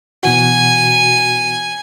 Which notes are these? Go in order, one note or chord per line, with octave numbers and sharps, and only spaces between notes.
B2 E3 F#4 G#5